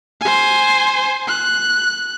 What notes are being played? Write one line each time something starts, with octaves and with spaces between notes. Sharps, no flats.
C5 G#5
F#6